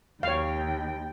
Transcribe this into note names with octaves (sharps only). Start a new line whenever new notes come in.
D#2 C#5 F5 G5